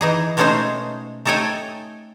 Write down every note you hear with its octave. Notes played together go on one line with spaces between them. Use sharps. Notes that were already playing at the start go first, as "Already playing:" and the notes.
E3 D#4 G#4
B2 G#3 A3 C#4 D#4 C5
A3 D#4 A4 C#5 G5 G#5